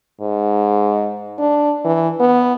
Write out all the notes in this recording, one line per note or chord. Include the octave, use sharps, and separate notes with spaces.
G#2
D4
E3
B3